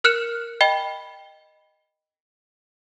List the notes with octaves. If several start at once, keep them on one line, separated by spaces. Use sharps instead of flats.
A#4 F6 F#6 C#7 E7
D#5 G5 B5 G7